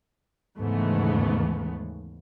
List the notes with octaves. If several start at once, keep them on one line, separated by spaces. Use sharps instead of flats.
D#2 G#2 C#3 E3 A3 B3